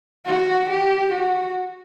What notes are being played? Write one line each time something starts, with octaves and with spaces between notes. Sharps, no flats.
F#4
G4
F#4